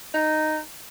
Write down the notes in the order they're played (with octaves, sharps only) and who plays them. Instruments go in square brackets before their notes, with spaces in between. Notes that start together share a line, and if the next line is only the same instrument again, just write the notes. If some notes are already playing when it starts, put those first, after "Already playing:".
[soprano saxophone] D#4